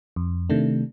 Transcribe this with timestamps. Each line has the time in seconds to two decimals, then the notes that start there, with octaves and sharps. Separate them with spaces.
0.16 F2
0.50 C3 D#3 A3 D4